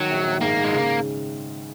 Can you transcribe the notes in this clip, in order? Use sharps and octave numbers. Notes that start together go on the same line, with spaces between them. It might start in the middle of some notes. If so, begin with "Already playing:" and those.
Already playing: D#3 F#3
A#1
A#1
G#2 A#3
G#2
G#3
C#3